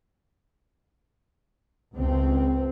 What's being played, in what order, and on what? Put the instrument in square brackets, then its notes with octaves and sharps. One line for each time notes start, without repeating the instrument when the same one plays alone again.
[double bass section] C#2 C4